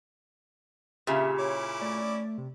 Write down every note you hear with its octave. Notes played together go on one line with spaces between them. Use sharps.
A#2 C#3 G4 E5
C#4 E4 C#5 D6
A3 D5
C3